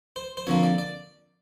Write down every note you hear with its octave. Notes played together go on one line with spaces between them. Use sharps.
C5
C5
F2 D3 F3 A#3 C#5
D5
D5